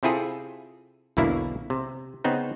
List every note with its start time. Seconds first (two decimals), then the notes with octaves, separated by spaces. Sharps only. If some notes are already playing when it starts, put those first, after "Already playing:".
0.03 C3 C4 E4 F4 G#4 A4
1.17 B1 E2 B2 D3 A#3 E4
1.70 C3
2.24 C#3 B3 C4 D#4